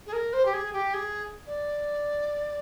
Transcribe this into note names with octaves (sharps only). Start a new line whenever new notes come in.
G#4
A#4
C5
G4
G#4
G4
G#4
D5